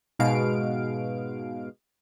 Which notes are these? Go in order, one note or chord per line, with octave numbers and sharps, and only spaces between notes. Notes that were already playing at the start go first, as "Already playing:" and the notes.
G#2 B2 G#3 F5 D7